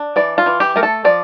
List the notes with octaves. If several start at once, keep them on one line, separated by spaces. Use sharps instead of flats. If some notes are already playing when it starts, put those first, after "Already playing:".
Already playing: D4
E3 D5
F4
E3
G4
A3 A#4
A4
F3 D5